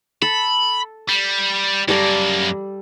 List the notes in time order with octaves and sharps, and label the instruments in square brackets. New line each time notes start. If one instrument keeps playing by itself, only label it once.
[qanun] A4 [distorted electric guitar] B5
[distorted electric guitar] G3
[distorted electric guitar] F#2 A#3 [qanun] G3 A4 D5